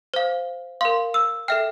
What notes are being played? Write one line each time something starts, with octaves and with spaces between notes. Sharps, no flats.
C5 F5
A#4 F5 C6
E6
A4 E5 G5 F6